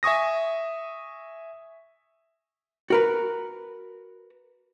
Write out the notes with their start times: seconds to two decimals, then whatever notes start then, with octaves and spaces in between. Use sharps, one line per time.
0.03 E5 G#5 C#6 D#6 A#6
2.90 F#4 A#4 B4